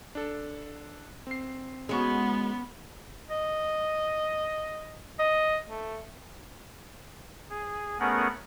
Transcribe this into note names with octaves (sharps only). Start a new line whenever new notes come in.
D4 A4
C4 C7
G#3 B3 C#4 F#4 C#6
D#5
D#5
A3
G#4
A3 B3 C#4 G#4 A#4 F#5